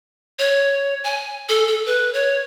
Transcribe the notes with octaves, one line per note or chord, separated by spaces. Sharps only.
C#5
G#5
A4
A4
B4
C#5